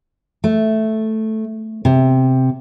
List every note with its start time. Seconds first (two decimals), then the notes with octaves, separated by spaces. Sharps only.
0.44 A3
1.85 C3